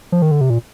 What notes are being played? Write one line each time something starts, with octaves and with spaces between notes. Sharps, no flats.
F3
D#3
D3
C3
A#2